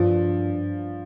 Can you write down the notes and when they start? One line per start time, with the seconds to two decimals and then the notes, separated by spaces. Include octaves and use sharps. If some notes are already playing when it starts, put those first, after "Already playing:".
Already playing: G2 F3